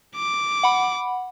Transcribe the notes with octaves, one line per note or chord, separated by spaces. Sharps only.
D6
F#5 B5